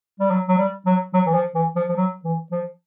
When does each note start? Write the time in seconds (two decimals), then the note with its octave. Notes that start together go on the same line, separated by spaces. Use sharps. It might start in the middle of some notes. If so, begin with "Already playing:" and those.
0.20 G3
0.30 F#3
0.48 F#3
0.58 G3
0.86 F#3
1.13 F#3
1.26 E3
1.34 F3
1.55 E3
1.75 F3
1.89 F3
1.96 F#3
2.24 E3
2.52 F3